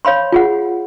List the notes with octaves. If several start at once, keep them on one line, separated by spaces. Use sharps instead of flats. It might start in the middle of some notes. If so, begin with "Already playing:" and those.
C#5 F5 B5 C6
F4 G#4 F#5